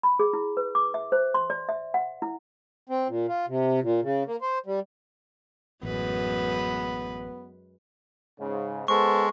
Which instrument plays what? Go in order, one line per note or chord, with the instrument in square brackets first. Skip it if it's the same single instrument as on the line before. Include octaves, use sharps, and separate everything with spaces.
[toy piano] B5
G#4
E4
B4
D6
E5
C5
C6
D5
E5
F#5
E4
[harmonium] C4
A#2
F4
C3
A#2
C#3
A#3
C5
G3
[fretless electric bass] A1 [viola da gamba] F#2 G#3 B4 [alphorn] B3
[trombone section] G#2 C#3
[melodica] G#3 [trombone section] B3 A4 C5 [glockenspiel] C#6